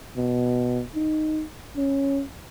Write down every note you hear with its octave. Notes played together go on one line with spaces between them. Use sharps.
B2
D#4
C#4